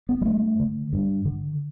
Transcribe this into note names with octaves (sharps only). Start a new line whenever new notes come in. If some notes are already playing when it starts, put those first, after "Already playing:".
B3
G3
G2 A3
D3
G2
D3